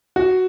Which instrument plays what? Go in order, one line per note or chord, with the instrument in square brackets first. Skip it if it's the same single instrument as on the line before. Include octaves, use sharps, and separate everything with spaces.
[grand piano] F#4